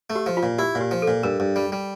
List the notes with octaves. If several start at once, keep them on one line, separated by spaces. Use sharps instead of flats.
A3
G4
F3
F4
A#2
E4 G4
A#2
G4
F3
A4
A#2
G2 A#4
G2
G3
G3